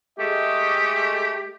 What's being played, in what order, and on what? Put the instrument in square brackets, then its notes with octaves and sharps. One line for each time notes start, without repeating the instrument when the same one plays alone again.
[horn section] G#3 A3 [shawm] G4 [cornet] D#5